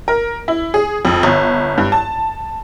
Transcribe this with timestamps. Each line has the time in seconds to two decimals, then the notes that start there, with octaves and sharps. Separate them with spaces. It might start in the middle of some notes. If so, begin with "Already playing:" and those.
0.08 A#4
0.48 E4
0.74 G#4
1.05 F2
1.23 G1
1.78 G2
1.92 A5